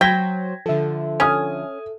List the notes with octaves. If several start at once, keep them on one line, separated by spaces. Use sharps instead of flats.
F#3 C5 G5 G#6 A#6 B6
D3 F3 A4 E5
C#4 G#5 D#6 F6